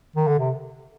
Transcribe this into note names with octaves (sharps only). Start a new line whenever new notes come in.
D#3
D3
C3